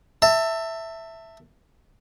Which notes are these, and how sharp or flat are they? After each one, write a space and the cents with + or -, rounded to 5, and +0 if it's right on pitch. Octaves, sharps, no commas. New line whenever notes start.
E5 +0 A5 +30